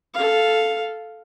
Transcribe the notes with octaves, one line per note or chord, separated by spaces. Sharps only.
A4 F5